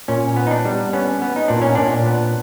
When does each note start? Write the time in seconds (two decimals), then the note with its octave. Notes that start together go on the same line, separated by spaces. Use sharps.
0.08 A#2 C#4
0.36 B3
0.47 D#4
0.51 D4
0.65 G3
0.93 B3 C#4
1.22 B3
1.36 D#4
1.48 A#2 D4
1.62 C#4
1.75 A#2 D4
2.06 B3